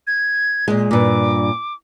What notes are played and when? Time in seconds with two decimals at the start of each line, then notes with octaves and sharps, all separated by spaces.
0.07 G#6
0.68 A#2 G#3
0.91 G2 A#2 D6